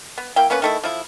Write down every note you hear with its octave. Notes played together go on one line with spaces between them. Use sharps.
B3
A#3 E4 G5
A#3 B3 C#4 B4
D#3 A3 E4
F3 E4